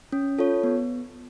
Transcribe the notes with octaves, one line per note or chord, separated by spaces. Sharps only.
C#4
F4 A4 C#5
B3